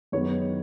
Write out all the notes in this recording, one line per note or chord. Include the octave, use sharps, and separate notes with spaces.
F#2 D#3 G#3 B3 D#4 C#5